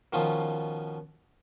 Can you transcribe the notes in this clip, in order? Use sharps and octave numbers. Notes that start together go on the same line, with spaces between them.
B2 D#3 F3 C#4 F4